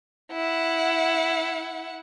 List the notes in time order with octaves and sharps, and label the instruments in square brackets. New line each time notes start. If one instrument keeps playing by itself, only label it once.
[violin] E4 F#5